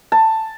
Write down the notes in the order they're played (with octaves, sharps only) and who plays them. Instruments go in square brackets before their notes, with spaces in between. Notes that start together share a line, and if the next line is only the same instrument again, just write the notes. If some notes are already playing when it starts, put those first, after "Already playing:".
[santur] A5